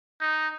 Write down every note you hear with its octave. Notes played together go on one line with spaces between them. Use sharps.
D#4